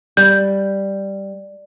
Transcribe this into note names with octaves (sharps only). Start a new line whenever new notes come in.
G3 G6